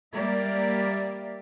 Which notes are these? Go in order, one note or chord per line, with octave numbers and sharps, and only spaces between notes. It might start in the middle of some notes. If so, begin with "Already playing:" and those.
G3 A#3 G4 A#4 D5 E5